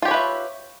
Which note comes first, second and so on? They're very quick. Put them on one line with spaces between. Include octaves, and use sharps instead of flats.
F4 G4 C#5 B4 E5